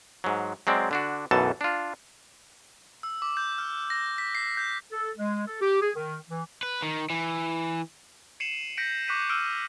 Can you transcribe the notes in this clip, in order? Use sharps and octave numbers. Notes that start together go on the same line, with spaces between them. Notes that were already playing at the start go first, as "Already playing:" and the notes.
G#2 F#3
F#3 G#3 C4 D5
D3 D4 F#4
B1 F#2 B2 E3 A4 A5
D4 F4
E6
D6
G6
F6
A#6
B6
C7
G6
A4
G#3
A4
G4
G#4
D#3
E3
B4
D#3
E3
C7 C#7 D#7 E7 F#7
G6 A#6 B6 C#7 D7
C#6 D6 F#6 G6 B6 D#7
E6 F6 D7 D#7